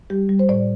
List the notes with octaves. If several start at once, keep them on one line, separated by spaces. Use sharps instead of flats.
G3 G4
G3
C5
A2 D5